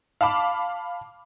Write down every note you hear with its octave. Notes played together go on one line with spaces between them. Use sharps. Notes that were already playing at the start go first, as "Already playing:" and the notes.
F5 A5 B5 D6